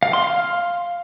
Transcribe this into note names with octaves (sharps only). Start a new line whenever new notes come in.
F5
C6
F5